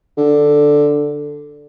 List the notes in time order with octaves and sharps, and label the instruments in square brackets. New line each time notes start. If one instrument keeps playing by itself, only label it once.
[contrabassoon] D3